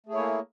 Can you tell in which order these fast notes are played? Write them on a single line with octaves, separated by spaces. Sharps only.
A3 G#4 E4 C#5 A#3